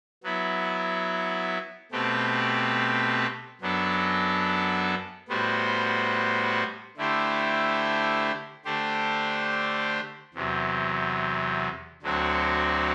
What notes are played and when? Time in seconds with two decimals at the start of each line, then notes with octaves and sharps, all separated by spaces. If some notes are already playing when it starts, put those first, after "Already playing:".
0.23 F#3 B3 E4
1.92 B2 A3 C4 G4 B4
3.61 F#2 F#3 B3 D4 A4
5.28 A2 G3 B3 F#4 C5
6.97 D3 A3 E4 G4 C5
8.65 D3 A3 D4 G4 C5
10.34 E2 C3 F#3
12.02 D2 D3 F#3 C4 F#4